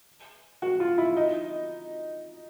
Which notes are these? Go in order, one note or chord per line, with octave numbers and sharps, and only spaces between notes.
F#4
F4
E4
D#4